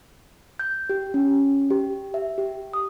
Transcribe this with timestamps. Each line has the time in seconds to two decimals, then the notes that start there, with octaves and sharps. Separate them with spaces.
0.59 G6
0.89 G4
1.14 C#4
1.70 G4
2.14 E5
2.38 G4
2.74 D#6